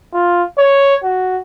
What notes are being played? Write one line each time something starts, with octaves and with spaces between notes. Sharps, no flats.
F4
C#5
F#4